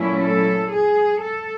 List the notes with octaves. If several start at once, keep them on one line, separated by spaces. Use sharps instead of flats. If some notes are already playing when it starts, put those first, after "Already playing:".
Already playing: A#2 F#3 A3 C#4 E4
A4
G#4
A4